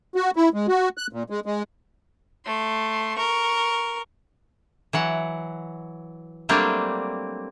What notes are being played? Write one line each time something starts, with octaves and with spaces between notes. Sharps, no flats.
F#4
E4
G#3
F#4
F#6
A#2
G#3
G#3
A3 C6
A#4 C#6
E3 F#3 F#5
F#3 G3 A3 A#3 C4 D4